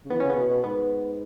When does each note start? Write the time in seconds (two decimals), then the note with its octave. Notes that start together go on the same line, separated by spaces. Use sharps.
0.05 C#3
0.10 E3 B3
0.20 C#3 C#4
0.30 B3
0.37 B2
0.50 B2
0.64 G#2 B3